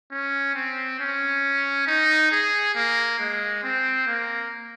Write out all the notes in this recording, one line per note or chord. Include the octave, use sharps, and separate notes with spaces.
C#4
C4
C#4
D#4
G#4
A#3
G#3
C4
A#3